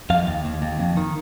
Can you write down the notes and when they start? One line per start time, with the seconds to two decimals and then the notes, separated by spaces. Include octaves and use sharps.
0.10 F2 F5
0.27 D#2
0.45 D#2
0.62 D#2
0.80 F2
0.97 D#3